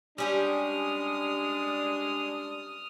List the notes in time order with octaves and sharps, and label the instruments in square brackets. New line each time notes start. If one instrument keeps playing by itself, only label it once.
[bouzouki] G3 C#4 G4 [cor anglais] G#3 [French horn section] D4 [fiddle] D#6 F6